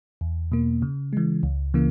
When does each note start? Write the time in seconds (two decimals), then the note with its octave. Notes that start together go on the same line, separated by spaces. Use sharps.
0.21 E2
0.52 B2 A#3
0.82 C#3
1.13 E3 G#3
1.43 C#2
1.74 C#3 E3 A#3